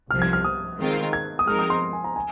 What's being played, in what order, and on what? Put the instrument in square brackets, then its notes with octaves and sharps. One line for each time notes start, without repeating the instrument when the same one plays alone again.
[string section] C2 C3 F3 [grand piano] F6
[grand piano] G#6
F6
D#6
[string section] D#3 G#3 C4 F4 A#4
[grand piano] G#6
D#6
[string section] F3 G#3 C4 D#4 A#4 [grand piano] F6
[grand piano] D#6
C6
G#5
A#5
G#5